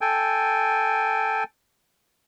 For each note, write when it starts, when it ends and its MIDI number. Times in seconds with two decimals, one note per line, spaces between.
0.01 1.44 69
0.01 1.44 79
0.01 1.44 80